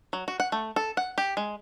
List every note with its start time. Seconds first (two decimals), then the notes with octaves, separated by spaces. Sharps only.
0.13 F#3
0.28 F#4
0.40 F#5
0.52 A3
0.76 A4
0.97 F#5
1.18 G4
1.37 G#3